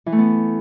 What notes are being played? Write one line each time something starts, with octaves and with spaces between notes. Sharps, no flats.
E3
A3
B3